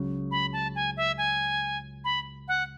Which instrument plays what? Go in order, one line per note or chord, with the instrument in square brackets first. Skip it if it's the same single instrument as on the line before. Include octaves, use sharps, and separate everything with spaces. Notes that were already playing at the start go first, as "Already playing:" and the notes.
Already playing: [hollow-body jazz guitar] C#2 C#3 F#3
[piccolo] B5
A5
G#5
E5
G#5
B5
F#5